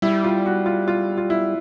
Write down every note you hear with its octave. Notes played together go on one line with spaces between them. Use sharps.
G3 E4
F4
F#4
F4
F4
F4
E4